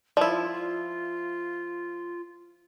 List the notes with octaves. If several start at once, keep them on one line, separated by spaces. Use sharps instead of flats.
F3 E4 F4 D5